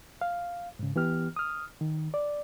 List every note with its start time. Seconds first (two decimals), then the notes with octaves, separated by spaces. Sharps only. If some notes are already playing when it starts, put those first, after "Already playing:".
0.21 F5
0.79 G#2 C#3
0.96 E3 B3 G4 F6
1.36 D#6 F6
1.81 D#3
2.14 D5